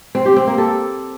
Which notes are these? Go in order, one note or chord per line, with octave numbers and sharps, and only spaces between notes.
C4
G4
C4
A#3
A4